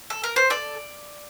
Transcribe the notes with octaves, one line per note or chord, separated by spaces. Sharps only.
A4
A#4
C5
A4 D5